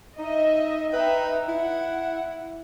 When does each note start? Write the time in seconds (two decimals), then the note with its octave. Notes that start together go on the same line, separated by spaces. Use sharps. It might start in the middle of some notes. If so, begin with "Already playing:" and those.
0.19 D#4 D#5 E5
0.93 D#4 B4 E5 G5
1.48 E4 F#5